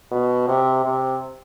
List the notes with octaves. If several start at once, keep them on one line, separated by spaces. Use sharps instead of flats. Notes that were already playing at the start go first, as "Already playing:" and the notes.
B2
C3
C3